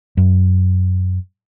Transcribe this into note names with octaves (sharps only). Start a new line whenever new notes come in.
F#2